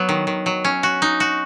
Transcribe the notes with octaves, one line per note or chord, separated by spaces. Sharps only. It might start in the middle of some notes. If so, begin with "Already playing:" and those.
Already playing: F#3 B3
D#3
D#3
F#3
C#4
F#4
D#4
F#4